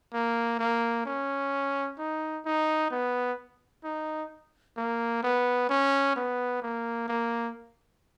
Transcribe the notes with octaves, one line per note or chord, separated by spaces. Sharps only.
A#3
A#3
C#4
D#4
D#4
B3
D#4
A#3
B3
C#4
B3
A#3
A#3